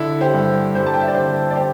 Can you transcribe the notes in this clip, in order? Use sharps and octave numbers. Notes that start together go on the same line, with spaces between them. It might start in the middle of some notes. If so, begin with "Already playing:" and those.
Already playing: D3 E4 A4
G4 C5
G2
G2 G4 C5
A5
G5
E5
D5
D3 G4 C5
D5
G4 C5